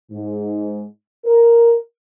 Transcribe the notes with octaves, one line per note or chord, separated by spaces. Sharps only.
G#2
A#4